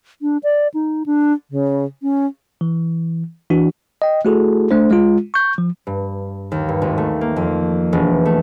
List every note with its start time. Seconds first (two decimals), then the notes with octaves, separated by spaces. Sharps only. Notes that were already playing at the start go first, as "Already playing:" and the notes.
0.22 D4
0.43 D5
0.74 D#4
1.06 D4
1.50 C#3
2.02 C#4
2.61 E3
3.50 E3 D4 F#4
4.02 D#5 G5
4.25 A3 E4 F#4 G#4 A4
4.71 A3 D4 C5
4.91 G#3 F4
5.34 C#6 G6
5.58 F3
5.87 G2
6.52 D#2
6.69 G2
6.82 G#1
6.98 A3
7.21 A#3
7.36 F2
7.93 E1
8.25 A3